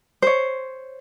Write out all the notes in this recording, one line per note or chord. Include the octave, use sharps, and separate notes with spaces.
C5 C#5